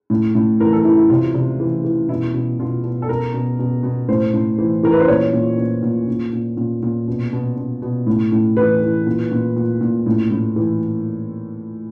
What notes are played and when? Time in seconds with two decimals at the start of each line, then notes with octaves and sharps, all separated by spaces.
0.10 A2
0.35 A2
0.60 E3 A#4
0.73 A4
0.85 E3 E4
0.97 E4
1.10 C3 F4
1.34 C3
1.60 E3
1.84 E3
2.09 B2 E4
2.34 B2
2.59 B2 F4
2.84 B2
3.02 A4
3.09 B2 A#4
3.34 B2
3.59 B2
3.83 B2
4.08 A2 C5
4.34 A2
4.58 E3
4.83 E3 A#4
4.92 B4
5.00 C5
5.08 A#2 C#5
5.33 A#2
5.58 A#2
5.83 A#2
6.08 A#2
6.33 A#2
6.57 A#2
6.83 A#2
7.08 B2
7.33 B2
7.57 B2
7.82 B2
8.07 A2
8.32 A2
8.57 E3 B4
8.82 E3
9.07 A#2
9.32 A#2
9.56 A#2
9.81 A#2
10.06 A2
10.31 A2
10.56 E3